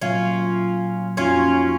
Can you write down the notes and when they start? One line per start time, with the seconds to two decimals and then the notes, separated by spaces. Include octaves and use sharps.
0.01 A#2 F#3 A#3 C#4 F4
1.17 F2 F3 A#3 C#4 D#4 F4 F#4